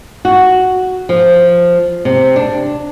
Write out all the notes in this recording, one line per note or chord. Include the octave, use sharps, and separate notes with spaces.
F#4
F3
C3
D4